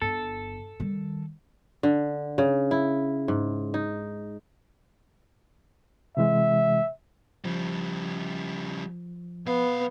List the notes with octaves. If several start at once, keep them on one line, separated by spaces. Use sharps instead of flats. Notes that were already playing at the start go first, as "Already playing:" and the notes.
G1 A4
D#3 G3
D3
C#3
E4
G#2
D#4
C3 E3 G#3 E5
C#3 F3 G3
B1 B3 F5